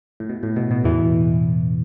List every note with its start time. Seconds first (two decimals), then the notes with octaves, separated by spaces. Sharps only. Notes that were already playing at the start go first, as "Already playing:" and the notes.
0.20 A2
0.29 B2
0.43 A2
0.56 B2
0.71 B2
0.84 E2 E3